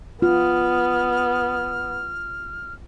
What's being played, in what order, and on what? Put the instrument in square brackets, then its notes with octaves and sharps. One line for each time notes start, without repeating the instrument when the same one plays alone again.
[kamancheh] B3 [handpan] F4 [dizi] F6